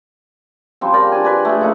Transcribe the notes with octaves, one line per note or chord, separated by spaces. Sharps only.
C#3 F3 G3 C4
A#4 D5 G5
D4 G#5
B4 D5 G#5
A3 G#4
A#2 C#3 D#4 A4